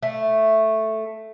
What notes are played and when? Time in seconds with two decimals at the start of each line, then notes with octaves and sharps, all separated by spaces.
0.03 A3